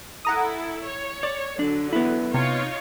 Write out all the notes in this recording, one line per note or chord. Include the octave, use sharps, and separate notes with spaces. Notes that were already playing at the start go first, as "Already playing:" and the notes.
E4 A4 F#5 A#5 D#6
C#5
D5
D3 F#3 D4
B3 E4
C3 D#4 F4 C#5